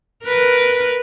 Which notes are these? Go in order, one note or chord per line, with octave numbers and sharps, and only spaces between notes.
A#4 B4